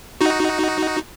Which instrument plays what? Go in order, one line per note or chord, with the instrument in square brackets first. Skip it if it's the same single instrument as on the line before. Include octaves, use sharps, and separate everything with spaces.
[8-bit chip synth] D#4 F#4